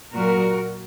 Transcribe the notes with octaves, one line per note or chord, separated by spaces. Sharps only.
A#2 F#3 F#4 A#4